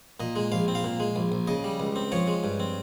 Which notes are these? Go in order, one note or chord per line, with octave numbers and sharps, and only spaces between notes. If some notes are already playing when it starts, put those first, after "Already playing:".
A#2 D#5
G#3
A#1 F5
C4
F5
A#2
G#3
A#1
A#1
C#3 D#5
G3
C#2
C4
F3 C#5
G#3
G2
C4